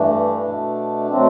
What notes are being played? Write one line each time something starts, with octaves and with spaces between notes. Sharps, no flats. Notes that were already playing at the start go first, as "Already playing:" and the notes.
Already playing: G2 E3 A3 D4
B2 A3
B2 F#3 A3 C4